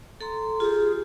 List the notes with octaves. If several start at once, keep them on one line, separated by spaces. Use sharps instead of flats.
A4 A#5 C6
F4 G4 G#4